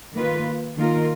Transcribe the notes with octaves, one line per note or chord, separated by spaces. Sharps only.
D#3 A#3 F4 B4
D#3 A#3 F4 A#4